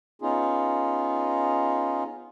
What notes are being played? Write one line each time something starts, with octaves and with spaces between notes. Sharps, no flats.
B3 C#4 D#4 F4 G#4